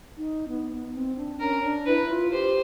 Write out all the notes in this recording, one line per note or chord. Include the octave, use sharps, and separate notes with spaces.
D#4
B3
B3
C4
D4
C#4 A#4
D4
E4 B4
F4
G4 C5